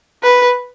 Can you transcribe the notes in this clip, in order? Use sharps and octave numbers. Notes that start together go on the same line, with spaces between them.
B4